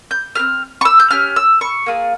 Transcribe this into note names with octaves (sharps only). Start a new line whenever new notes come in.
G6
C4 G4 F6
C#6
E6
G6
C#4 G4 F6
E6
C#6
A#3 F4 G#4